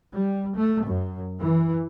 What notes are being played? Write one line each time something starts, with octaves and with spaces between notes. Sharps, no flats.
G3
A3
F#2
E3